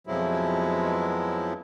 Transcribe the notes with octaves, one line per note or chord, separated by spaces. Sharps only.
F2 B2 F3 F#3 G#3 E4